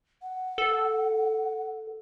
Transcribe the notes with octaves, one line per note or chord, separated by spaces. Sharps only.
F#5
A4